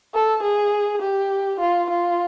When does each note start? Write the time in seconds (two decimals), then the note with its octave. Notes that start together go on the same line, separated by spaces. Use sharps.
0.14 A4
0.43 G#4
1.02 G4
1.60 F4
1.90 F4